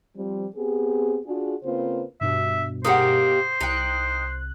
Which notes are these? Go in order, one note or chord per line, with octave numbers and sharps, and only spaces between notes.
F3 G3 C4
B3 C4 G4 G#4
D4 F4 F#4 G#4
C#3 A#3 C4 F4 B4 C5
G2 B2 E5
A#3 D#4 G4 G#4 C5 F#5
C2 D#4 G5 F#6